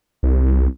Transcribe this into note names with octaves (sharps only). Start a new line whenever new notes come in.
C2